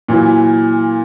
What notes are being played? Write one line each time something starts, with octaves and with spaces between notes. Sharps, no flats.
A#2 E3 F#3